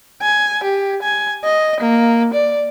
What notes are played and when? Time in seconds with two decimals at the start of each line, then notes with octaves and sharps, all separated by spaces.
0.22 G#5
0.64 G4
1.02 G#5
1.44 D#5
1.80 A#3
2.34 D5